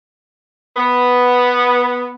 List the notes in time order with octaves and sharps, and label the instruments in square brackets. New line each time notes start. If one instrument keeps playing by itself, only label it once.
[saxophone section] B3